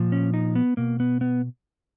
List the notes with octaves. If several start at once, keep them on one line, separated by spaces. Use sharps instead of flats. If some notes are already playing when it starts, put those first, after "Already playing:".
Already playing: A#2 F3
C#4
D#4
B3
B2 A#3
B3
B3